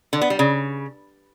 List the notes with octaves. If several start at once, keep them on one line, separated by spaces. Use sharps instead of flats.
D3
B3
G3
C#3